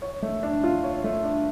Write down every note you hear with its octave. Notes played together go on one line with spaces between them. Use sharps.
C#5
A3
D4
F4
C#5
A3
D4